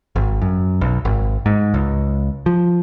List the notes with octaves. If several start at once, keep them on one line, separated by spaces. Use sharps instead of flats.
G#1
F#2
B1
G#1
G#2
C#2
F3